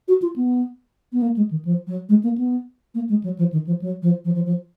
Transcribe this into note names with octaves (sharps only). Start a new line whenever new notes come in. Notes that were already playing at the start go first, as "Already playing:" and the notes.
F#4
F4
B3
B3
A#3
G#3
D#3
F3
F#3
G#3
A#3
B3
A#3
G#3
F#3
F3
D#3
F3
F#3
F3
F3
F3
F3